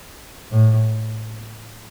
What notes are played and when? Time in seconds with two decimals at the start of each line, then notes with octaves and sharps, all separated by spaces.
0.51 A2